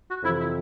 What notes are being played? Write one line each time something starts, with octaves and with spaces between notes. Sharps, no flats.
F#4
F2 C3 E3 E4
E4